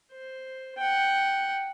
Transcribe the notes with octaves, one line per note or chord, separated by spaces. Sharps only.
C5
F#5 G5